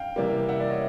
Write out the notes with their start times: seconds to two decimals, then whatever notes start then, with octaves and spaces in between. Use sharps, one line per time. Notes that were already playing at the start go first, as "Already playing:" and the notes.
Already playing: F5 G5
0.16 C3 E3 G3 A#3
0.48 E5 F#5
0.60 D5 E5
0.70 C#5 D#5